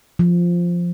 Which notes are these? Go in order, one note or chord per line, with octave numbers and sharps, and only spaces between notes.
F3